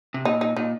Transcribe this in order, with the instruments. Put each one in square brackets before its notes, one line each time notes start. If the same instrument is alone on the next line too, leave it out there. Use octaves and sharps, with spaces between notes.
[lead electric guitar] C3
[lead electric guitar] A#2 [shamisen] D#4
[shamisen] D#4
[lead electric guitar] A#2 [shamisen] D#4